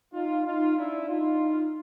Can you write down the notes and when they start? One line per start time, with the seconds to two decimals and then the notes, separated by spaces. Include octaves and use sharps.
0.13 D#4 F4
0.45 D#4 F4
0.76 D4 E4
1.08 D#4 F4